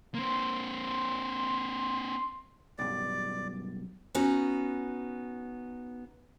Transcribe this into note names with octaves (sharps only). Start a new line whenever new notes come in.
A#3 C4 C6
B1 G2 D5
B3 C#4 D#4 F#4